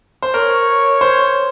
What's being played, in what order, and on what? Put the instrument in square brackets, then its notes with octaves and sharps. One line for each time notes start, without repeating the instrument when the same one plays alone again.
[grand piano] C5
[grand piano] A#4 [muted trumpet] C#5
[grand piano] C5